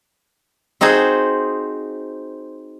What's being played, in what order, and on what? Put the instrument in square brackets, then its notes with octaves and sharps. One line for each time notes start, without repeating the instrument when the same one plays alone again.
[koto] C4 D#4 F#4 G#4 C5